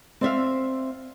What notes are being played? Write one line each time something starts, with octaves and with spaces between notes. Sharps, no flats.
C4 D5 E5 F5